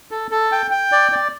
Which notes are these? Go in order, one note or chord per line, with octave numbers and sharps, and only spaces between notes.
A4
A4
G5
G5
D5
D5